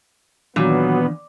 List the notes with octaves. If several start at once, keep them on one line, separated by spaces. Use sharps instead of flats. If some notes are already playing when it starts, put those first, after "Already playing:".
A#2 D#3 E3 F#3 B3 D4